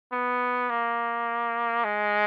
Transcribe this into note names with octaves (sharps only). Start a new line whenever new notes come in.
B3
A#3
G#3